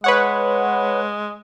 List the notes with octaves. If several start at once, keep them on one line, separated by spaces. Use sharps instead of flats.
G#3 B4 C#5 F#5